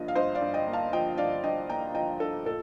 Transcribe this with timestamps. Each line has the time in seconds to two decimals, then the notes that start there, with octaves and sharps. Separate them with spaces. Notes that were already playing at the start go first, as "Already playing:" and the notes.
Already playing: G2 F3 A#3 D#5
0.08 F5
0.15 G2 C5 D#5
0.35 D5 F5
0.41 G2
0.54 D#5 G5
0.67 A#3
0.73 F5 A5
0.93 F3 D#5 G5
1.17 G2 D5 F5
1.43 G2 D#5 G5
1.69 A#3 G5 A#5
1.94 F3 D#5 G5
2.20 G2 A4
2.46 A#2 A4